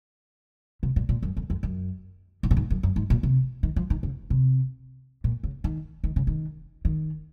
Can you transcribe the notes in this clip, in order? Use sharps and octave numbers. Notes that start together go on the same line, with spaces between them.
C3
A#2
A#2
F#2
F2
F2
F#2
G#2
A#2
G#2
F#2
F#2
G#2
A#2
C3
D#3
F3
D#3
C#3
C3
A#2
C#3
D#3
D#3
C#3
D#3
D#3